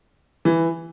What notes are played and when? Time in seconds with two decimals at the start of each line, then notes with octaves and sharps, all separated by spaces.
0.45 E3